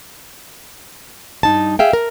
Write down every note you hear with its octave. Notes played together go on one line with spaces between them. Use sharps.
G2 D#4 A5
G#4 E5 F5 G5
A#4